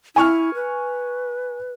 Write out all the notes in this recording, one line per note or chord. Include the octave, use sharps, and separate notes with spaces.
E4 G#5 C#6 F6
B4